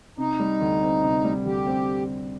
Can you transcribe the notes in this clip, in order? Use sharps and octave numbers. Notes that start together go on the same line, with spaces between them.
C3 D#4
G3
D2
C4
C3
G3
D2 G4
C4